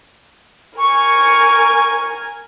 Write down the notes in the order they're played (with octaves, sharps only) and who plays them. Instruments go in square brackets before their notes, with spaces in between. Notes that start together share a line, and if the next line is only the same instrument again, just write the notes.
[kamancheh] A#4 G#5 [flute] C#6